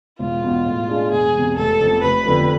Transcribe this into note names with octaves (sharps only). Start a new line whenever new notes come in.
E1 F4
E2 B2
A2
G#3 D4 G#4
E1 G#4
E2 C3
F1 A4
F2 C3
F1 B4
F2 D3 F3